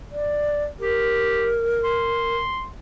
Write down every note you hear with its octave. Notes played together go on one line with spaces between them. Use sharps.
D5
G4 A#4
C6